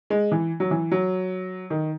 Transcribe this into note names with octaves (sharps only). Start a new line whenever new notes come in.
G#3
E3
F#3
E3
F#3
D#3